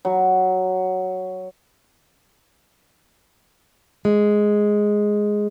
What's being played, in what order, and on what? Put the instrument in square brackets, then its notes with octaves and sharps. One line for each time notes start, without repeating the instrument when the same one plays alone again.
[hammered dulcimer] F#3
[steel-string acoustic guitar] G#3